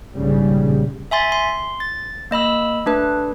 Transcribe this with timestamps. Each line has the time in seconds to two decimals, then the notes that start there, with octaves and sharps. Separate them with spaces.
0.15 A#1 G#2 C#3 G3
1.11 E5 G#5 C6 A6
1.32 C6
1.80 A6
2.31 A#3 D#5 B5 E6
2.86 A3 D4 B4